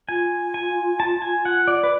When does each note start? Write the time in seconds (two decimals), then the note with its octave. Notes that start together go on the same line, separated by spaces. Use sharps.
0.09 F4 G#5
0.54 G#5
1.00 A5
1.22 G#5
1.45 F#5
1.67 D5
1.83 B4